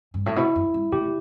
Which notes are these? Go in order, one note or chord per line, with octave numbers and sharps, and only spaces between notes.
G2
A2
B2 E4
F#2
G2
A2 G4